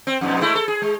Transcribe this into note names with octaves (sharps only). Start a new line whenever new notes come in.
C4
F2 G#2 B2
G#3 A3 E4
A4
G#4
G#3